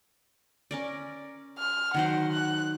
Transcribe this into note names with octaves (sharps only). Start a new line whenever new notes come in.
C#4 A#4 D5
F6
D#3 F#3 C5 F#5
F#6